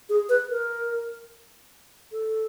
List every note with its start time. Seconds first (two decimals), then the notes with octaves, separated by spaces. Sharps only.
0.09 G#4
0.29 B4
0.50 A#4
2.12 A4